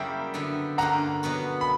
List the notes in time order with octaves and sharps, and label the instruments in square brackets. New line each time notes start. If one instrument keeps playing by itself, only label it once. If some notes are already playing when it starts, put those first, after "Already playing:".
Already playing: [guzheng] F#2 C#3 G3 A#3 E4 [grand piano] E5 G5
[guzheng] D3 G3 B3 E4
[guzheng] G2 D3 A#3 C#4 G4 [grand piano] F#5 A#5
[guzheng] B2 F#3 B3 F#4
[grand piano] B5